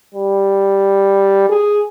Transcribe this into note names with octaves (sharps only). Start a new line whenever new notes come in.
G3
G#4